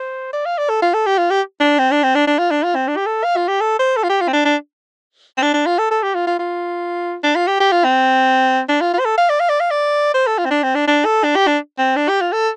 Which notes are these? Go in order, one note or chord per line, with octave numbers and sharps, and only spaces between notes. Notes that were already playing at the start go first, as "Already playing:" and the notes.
Already playing: C5
D5
F5
D5
A4
F4
A4
G4
F4
G4
D4
C4
D4
C4
D4
D4
F4
D4
F4
C4
D4
G4
A4
F5
F4
G4
A4
C5
A4
F4
G4
F4
C4
D4
D4
C4
D4
D4
F4
A4
A4
G4
F4
F4
F4
D4
F4
G4
G4
F4
C4
D4
F4
F4
C5
A4
F5
D5
F5
D5
F5
D5
C5
A4
F4
C4
D4
C4
D4
D4
A4
D4
G4
D4
C4
D4
G4
F4
A4